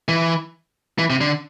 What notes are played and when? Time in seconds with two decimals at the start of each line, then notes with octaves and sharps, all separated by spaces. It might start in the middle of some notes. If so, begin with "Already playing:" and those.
0.08 E3
0.99 E3
1.10 C3
1.21 D3